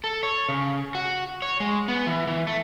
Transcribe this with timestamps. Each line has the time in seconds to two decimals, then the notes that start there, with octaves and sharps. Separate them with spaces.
0.04 A4
0.23 C#5
0.49 C#3
0.95 F#4
1.42 C#5
1.60 G#3
1.88 B3
2.07 E3
2.27 E3
2.47 A3